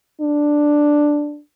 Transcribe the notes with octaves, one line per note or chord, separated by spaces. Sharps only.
D4